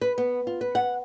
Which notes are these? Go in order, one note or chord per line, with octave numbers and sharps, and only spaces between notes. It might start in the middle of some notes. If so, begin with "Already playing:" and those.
B4
B3
F4
B4
F#5